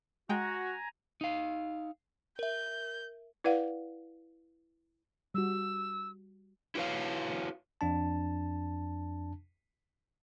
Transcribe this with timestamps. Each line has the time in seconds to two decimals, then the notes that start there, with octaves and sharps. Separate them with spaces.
0.29 G#3 F#4 G5 G#5 A#5
1.21 D#4 F5
2.39 A#4 E5 G6
3.44 E4 B4 D5 F5 F#5
5.34 G3 F#4 E6
6.75 E4 F#4 B4 C#5 F5
7.81 F2 D4 A5